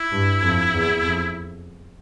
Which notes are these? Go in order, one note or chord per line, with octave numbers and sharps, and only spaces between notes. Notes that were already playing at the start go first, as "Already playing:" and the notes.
Already playing: E4
G2
F2
E2
F2